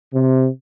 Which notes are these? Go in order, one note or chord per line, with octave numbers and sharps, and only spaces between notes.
C3